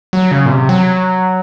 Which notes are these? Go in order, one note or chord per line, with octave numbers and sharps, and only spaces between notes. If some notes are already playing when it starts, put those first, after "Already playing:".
F#3
C#3
A#2
C3
F#3